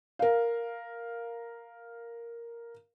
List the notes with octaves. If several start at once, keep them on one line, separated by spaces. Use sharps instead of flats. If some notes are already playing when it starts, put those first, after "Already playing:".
A#4 F5